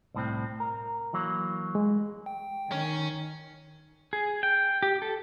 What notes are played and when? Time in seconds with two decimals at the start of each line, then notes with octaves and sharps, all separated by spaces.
0.14 C2 A2 C4
0.60 A#4
1.13 E3 F#3 A#3
1.75 G#3
2.26 G5
2.72 D#3 C#4
4.13 G#4
4.43 G5
4.83 G4
5.02 A4